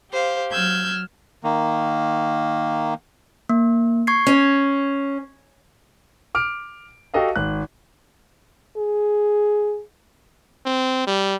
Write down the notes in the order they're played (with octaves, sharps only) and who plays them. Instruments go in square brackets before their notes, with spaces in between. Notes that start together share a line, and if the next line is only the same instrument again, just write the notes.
[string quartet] G4 C5 F5
F#3 E6 F6 G6 G#6
[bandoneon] D#3 A#3
[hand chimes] A#3
C#6 G#6 C7
[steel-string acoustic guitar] C#4
[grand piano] D6 F6 D7
F#4 G4 A4 D#5 F5
G#1 F#6
[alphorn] G#4
[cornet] C4
G3